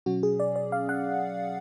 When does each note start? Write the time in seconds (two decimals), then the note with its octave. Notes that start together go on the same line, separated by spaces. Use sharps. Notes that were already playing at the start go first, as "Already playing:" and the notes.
0.06 B2 F#3 C#4 F#4
0.23 G#4
0.40 D5
0.56 D5
0.72 F5
0.89 F#5